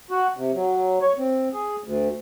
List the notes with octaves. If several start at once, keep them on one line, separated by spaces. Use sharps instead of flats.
F#4
C3
F#3
C#5
C4
G#4
D2